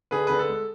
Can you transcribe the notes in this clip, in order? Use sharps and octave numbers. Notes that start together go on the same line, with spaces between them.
D3 G#4 B4
D3 B4
A4
G#3